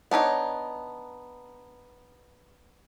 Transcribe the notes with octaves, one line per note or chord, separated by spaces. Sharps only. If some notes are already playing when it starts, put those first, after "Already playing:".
B3 D4 D#4 C#5